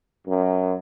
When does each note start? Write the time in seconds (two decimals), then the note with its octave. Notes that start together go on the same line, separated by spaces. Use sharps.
0.28 F#2